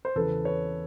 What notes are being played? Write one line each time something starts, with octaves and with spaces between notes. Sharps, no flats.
C5
E2 C#3 E3 A4 B4
B4 C#5